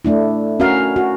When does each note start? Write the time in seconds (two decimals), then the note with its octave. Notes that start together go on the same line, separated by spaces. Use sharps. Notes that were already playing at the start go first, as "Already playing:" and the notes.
0.05 A3 D4 E4
0.60 C#4 F#4 A#4 F5
0.96 F#4